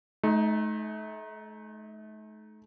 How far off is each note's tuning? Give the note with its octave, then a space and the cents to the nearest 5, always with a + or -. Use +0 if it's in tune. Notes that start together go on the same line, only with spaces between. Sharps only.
A3 -40 D#4 +10